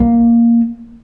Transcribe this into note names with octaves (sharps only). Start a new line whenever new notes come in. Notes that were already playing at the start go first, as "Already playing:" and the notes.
Already playing: A#3